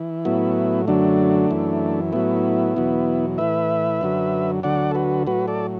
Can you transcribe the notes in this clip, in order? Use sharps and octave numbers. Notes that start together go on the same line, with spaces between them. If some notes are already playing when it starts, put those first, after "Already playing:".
Already playing: E3
A2 F#3 B3 E4
F#2 D3 F#3 A3 D4
F#2 E3
A2 F#3 B3 E4
E2 B2 F#3
A2 E3 B4 E5
F#2 D3 F#3
D2 D3 F#3 D5 F#5
A4
F#4 B4
A2 F#3 F#4 B4
A4 D5